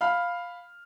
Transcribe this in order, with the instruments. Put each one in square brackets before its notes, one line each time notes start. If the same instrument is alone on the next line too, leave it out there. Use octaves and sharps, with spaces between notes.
[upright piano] F5 B5 F6